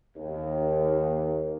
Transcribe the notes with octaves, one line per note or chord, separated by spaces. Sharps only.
D#2